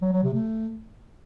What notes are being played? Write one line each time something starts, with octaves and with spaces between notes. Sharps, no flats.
F#3
F#3
C3
A3